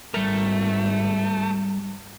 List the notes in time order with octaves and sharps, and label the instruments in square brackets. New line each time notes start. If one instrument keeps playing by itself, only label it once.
[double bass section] G#1 [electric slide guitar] G3 A#4 [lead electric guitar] A3